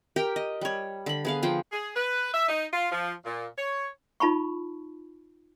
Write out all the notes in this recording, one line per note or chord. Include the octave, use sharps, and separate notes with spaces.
G4 A#4 G5
D#5
G3 C#5
D3 B5
B3 G#4 F5
F3 G#4 G5
G#4
B4
E5
D#4
F4
F3
A#2
C#5
D#4 F4 A5 B5 C#6